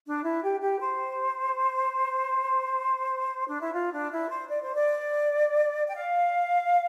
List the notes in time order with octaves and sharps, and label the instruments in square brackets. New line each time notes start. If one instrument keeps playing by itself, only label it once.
[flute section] D4
E4
G4
G4
C5
D4
E4
F4
D4
E4
C5
D5
C5
D5
G5
F5